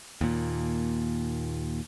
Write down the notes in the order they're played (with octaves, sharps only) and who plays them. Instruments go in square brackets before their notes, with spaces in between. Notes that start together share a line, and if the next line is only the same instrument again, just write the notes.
[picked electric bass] D#2 A#2